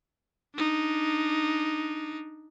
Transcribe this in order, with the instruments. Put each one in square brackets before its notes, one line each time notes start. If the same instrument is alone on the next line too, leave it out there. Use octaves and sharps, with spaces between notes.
[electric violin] D4 D#4